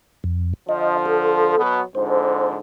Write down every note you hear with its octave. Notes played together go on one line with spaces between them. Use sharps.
F2
D3 F3 D#5
A4
B2 F#3 B3
F2 G#2 D3 C5